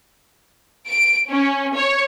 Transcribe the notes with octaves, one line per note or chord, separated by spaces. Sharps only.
D7
C#4
C#5